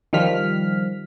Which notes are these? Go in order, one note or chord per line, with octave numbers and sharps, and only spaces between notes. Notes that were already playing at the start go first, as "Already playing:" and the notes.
D#3 F3 G3 F6 B6